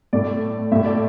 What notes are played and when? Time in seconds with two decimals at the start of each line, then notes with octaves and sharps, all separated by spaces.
0.13 A2 A3 D5
0.72 A2 A3 E5
0.85 D5